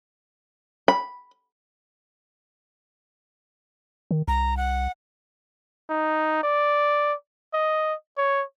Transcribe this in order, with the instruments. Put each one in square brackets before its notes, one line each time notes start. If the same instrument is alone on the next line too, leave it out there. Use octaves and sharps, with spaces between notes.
[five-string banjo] B5
[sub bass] D#3
[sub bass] C2 [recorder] A#5
[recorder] F#5
[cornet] D#4
D5
D#5
C#5